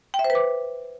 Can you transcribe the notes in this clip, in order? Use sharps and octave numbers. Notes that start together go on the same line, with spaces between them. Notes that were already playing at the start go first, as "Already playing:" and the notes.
G5
E5
C5
B4
D6